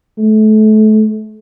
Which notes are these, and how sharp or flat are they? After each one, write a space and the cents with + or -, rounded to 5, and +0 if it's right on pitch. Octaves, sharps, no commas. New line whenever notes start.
A3 -30